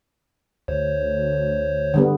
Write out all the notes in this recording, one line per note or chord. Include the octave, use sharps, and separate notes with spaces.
D2 C5 C#5
D3 G3 B3